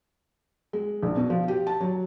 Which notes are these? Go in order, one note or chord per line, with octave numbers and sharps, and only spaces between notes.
G#3
A#1
B2
F3
G4
A5
F#3